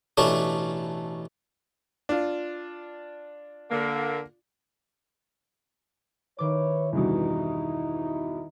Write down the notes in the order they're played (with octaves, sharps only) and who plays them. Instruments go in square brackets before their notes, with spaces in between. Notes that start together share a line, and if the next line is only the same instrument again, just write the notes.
[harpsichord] A1 B2 A3 C#4 D4 C#5
[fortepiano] D4 F4
[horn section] D3 A#3
[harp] D#3 D6 [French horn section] E4 B4 C#5
[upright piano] E2 G2 B2 [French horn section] D#4 E4